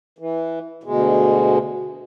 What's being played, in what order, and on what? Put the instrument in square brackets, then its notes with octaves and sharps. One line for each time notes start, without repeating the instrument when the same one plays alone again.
[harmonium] E3
D2 B2 G#3